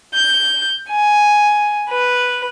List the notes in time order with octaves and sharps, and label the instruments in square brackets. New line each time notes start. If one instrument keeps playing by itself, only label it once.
[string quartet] G6
G#5
B4